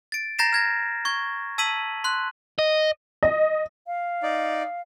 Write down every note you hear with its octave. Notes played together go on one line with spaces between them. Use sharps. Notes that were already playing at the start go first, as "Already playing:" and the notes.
A6 D7
A#5 G6 A6 A#6 C7 E7
F6 G#6 A#6
C#6 G#6
A5 E6 G#6 B6 D#7 F#7
C6 F#6
D#5
D#5
F5
D#4 D5